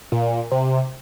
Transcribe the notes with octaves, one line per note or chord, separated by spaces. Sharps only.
A#2
C3